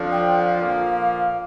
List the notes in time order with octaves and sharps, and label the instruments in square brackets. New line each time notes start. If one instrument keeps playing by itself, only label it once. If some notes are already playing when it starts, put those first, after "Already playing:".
Already playing: [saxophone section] F2 D3 F3
[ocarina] G5
G5
F5
[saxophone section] A#2 F3 A#3